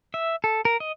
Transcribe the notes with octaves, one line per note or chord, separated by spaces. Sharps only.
E5
A4
A#4
D#5